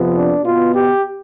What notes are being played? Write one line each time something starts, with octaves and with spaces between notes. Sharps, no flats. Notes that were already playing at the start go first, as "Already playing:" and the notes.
Already playing: F2 C3 F3 B3
D4
B2 B3 F4
G4